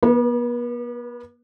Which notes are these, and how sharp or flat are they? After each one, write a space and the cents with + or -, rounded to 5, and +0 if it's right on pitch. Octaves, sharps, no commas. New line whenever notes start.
B3 -40 B4 +0